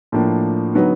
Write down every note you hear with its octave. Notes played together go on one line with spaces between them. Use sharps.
A2 F3 A#3 D4
D3 F#3 B3 D#4